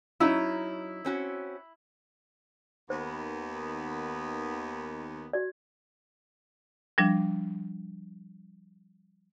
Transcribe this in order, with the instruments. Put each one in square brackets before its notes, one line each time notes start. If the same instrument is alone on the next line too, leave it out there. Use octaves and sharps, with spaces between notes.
[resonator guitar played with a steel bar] F#3 C#4 D#4 [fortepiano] E4
[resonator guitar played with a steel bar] C4 C#4 F#4
[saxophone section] D#2 D#3 B3 [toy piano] C5
[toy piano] F#4 D5
[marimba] F3 G3 D4